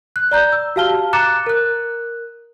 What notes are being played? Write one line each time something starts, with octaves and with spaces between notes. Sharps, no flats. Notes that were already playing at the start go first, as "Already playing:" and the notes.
F#6
D5 A#5 G6
E6
F#4 G4 F5 A5 F6 G7
A#5 D6 F#6 A6 C#7 E7
A#4 F#6